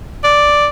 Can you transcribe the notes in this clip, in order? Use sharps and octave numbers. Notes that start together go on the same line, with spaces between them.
D5